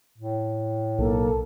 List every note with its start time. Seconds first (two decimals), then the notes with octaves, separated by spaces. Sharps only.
0.18 A2
0.99 B1 A#3 A4